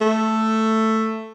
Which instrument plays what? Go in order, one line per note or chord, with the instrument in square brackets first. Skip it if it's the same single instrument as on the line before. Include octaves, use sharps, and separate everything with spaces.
[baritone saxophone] A3